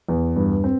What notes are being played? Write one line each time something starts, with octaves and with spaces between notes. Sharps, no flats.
E2
G2
C4